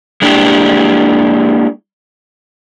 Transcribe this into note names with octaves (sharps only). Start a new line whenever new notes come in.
G#3 A#3 D4 E4 G4